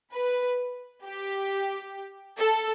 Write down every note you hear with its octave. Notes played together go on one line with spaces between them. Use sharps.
B4
G4
A4